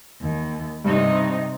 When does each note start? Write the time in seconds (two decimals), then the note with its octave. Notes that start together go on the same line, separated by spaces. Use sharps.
0.21 D#2
0.85 G2 C3 D#4